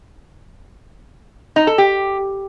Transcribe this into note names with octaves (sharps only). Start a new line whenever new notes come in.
D#4
A4
G4